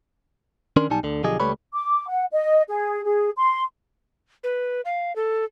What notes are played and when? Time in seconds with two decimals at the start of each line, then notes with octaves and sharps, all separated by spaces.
0.76 D#3 C#4 D4 A#4 C6
0.90 B1 G3 D#4 G#5 A5
1.03 D2 D3
1.24 B1 D3 F3 G4 G#4 D#5
1.40 C#2 G3 A3 B4 C#5 B5
1.74 D6
2.08 F#5
2.32 D#5
2.68 G#4
3.04 G#4
3.36 C6
4.44 B4
4.85 F5
5.16 A4